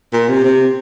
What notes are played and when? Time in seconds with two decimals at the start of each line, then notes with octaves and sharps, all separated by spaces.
0.13 A#2
0.29 C3
0.44 C3